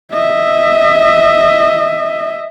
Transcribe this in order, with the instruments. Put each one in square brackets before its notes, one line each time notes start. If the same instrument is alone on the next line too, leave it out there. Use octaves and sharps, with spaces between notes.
[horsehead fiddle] D#5 E5